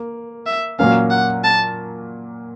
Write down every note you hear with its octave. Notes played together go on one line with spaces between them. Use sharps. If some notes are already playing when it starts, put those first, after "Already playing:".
Already playing: A#3
E5
A#2 F#3 A#3 C#4 F5
F#5
A5